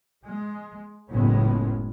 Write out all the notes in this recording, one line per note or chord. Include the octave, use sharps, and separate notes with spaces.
G#3
F#1 C#2 A2 G#3 B3 C#4